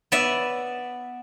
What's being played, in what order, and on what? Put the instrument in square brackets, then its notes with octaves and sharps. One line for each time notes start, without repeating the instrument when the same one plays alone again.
[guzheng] B3 D5 E5